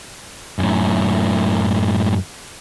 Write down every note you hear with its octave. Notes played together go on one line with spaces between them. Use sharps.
F#2 A2